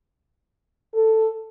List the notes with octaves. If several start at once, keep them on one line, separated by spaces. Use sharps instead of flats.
A4